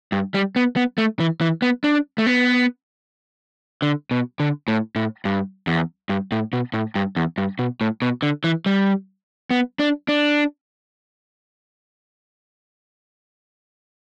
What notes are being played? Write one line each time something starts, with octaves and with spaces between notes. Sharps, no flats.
G2
G3
B3
B3
A3
E3
E3
B3
D4
A3
B3
D3
B2
D3
A2
A2
G2
E2
G2
A2
B2
A2
G2
E2
G2
B2
A2
B2
D3
E3
G3
B3
D4
D4